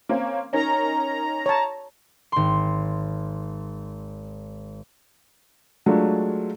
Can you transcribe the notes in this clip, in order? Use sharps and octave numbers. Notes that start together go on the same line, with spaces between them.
A#3 C4 C#4
C#4 D#4 A#4 A#5
C#5 A5
G#1 C6
F#3 G#3 A3 D4 F4